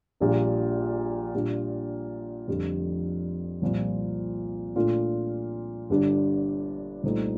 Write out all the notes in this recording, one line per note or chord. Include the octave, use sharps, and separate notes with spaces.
A#1 A#2 G3 D4
A#2 G3 D4
F1 F2 D3 G3
C2 A#2 F3
A#2 A3 D4 F4
G1 G2 D3 G3 D4
C2 A#2 A3 C4 D#4